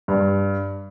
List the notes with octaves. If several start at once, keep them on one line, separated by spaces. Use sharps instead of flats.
G2